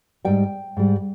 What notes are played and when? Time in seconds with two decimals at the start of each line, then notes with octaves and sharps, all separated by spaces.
0.25 G#2 G3 G5
0.77 G#2 G3